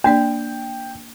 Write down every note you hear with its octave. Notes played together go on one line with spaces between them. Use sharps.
A#3 D4 D5 G5